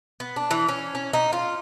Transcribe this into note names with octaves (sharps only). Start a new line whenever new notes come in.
B3
D4
E3
C#4
C#4
D#4
F4